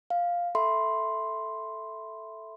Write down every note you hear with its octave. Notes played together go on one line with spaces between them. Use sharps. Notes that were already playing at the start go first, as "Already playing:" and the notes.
F5
A4 E5 B5 C6